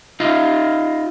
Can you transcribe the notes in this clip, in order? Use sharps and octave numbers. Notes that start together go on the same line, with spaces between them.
D#4 F4